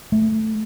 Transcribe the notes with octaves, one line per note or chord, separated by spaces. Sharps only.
A3